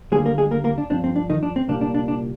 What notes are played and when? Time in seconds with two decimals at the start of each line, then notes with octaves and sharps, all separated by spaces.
0.12 D#2 D3 G3 G#3 A#3 G#4
0.25 A#3 A#4
0.38 G#3 G#4
0.51 A#3 A#4
0.64 A#3 A#4
0.78 D4
0.90 G2 F3 C4 D4
1.04 C4
1.16 D4
1.30 D#3 D#4
1.43 D4
1.56 C4
1.68 C2 A#2 G3 A#3 D4
1.81 D4
1.94 D4
2.08 D4